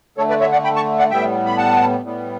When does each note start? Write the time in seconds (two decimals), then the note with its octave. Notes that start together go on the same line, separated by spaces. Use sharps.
0.17 D3 A3 A4 C#5
0.30 B4 D5
0.40 C#5 E5
0.52 D5 F#5
0.64 G5 B5
0.76 A5 C#6
0.99 D5 F#5
1.10 A2 G3 B3 E5 G5
1.46 B5
1.57 F#5 A5
2.03 A2 G3 B3